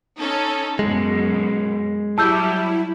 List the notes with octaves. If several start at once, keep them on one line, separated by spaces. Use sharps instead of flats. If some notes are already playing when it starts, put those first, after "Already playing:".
C#4 D#4 A4
F#2 B2 G#3
F#3 G3 E4 A5 E6 G6